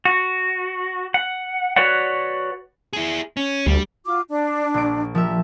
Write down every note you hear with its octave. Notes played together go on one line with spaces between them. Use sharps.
F#4
F#5
F#4 B4 C#5 D5 F#5
E4 G#4
C#4
D2 G3
F4 F#4 D6
D4
A#1 D7
F3 G4 A#4 E5